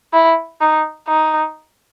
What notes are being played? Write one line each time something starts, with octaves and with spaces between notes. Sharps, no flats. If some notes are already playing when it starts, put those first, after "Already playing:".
E4
D#4
D#4